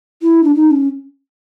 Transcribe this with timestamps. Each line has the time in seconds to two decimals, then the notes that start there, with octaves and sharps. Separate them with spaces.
0.22 E4
0.43 D4
0.55 D#4
0.71 C#4